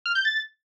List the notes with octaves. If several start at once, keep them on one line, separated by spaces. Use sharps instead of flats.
F6
G6
A6